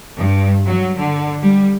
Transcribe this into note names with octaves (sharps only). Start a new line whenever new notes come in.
G2
F#3
D3
G3